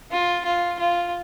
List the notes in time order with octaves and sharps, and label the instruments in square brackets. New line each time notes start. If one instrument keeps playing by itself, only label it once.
[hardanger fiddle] F4
F4
F4